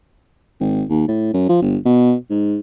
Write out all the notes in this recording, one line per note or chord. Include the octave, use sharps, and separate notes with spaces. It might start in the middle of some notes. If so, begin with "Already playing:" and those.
G#1
D#2
A2
F#2
F3
G1
B2
G#2